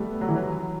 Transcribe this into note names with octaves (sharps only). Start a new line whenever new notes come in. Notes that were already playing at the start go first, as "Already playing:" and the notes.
Already playing: G3 A3 B3
F#3
E3
F#3